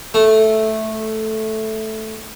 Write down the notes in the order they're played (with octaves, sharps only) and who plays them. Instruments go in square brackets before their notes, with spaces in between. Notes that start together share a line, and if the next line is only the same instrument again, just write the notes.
[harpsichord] A3